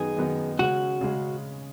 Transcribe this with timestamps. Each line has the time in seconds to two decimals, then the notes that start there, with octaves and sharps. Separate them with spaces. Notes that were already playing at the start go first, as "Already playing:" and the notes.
Already playing: F#2 D#3 B3 D#4 G#4
0.17 F#2 D#3 B3 D#4
0.59 C#3 G#3 C#4 F#4
1.01 C#3 G#3 C#4